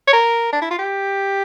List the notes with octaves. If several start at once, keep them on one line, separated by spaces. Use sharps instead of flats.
C#5
A#4
D4
E4
F4
G4